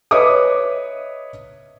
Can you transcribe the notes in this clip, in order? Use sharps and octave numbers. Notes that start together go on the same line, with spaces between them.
B4 C#5 D#5 E5 D6 D#6